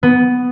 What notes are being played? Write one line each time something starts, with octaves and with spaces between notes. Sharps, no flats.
B3